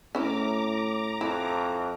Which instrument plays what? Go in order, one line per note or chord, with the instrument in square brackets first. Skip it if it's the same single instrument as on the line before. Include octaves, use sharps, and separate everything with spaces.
[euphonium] A2 [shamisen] C#4 E4 C#5 [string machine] A#5 D6
[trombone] F2 [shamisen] E4